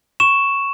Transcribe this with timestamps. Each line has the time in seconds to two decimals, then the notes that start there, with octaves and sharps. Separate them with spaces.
0.20 C#6 E7